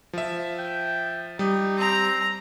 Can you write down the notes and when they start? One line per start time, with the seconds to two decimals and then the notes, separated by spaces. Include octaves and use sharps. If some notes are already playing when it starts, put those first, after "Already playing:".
0.13 F3 E5
0.58 G5
1.39 G3 D#4
1.78 C4 A#5